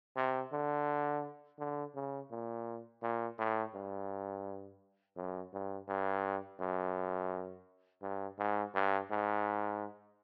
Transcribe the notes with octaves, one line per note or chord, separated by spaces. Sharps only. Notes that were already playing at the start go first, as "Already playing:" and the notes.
C3
D3
D3
C#3
A#2
A#2
A2
G2
F#2
G2
G2
F#2
G2
G#2
G2
G#2